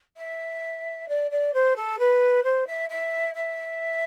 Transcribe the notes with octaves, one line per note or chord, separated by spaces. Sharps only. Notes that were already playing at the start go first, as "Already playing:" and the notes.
E5
D5
D5
C5
A4
B4
C5
E5
E5
E5